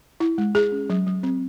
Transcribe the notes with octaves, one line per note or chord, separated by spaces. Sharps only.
E4
G#3
G#4
C#4
F#3
F#3
C4